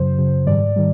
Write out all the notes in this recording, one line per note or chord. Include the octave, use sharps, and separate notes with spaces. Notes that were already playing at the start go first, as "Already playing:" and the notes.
Already playing: F#2 C#3 F#3 C5
F#2 C#3 F#3
G#2 D#3 G3 D5
D#3 G3